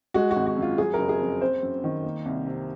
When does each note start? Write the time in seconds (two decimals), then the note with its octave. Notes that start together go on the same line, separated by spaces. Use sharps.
0.14 G#3 F#4
0.31 F#4
0.36 G#1
0.46 F#4
0.57 F#2
0.62 F4
0.78 F#3 G#4
0.94 F#1 A#4
1.09 G#4
1.20 F2
1.41 C4 C5
1.63 F#2
1.84 D#3
2.04 A#3
2.26 C2
2.46 C3